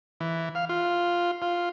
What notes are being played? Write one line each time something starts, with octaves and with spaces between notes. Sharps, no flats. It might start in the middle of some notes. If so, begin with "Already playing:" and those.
E3
F5
F4
F4